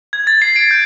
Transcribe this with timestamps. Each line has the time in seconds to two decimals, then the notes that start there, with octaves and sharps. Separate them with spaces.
0.13 G#6
0.27 A6
0.42 C7
0.56 D7
0.71 G6